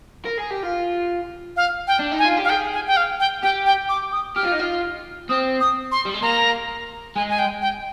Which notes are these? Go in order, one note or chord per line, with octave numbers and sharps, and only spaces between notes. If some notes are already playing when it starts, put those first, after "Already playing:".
A#4
G#4
G4
F4
F5
G5
D4
D#4
G#5
F4
G4
F5
G#4 G5
G#5
G5
F5
G5
G4 G5
G5
D6
D#6
G4 F6
F4
D#4
F4
C4 D#6
D#6
C6
G3
G#3
A#3 A#5
G#3 G#5
G#5
G5
G5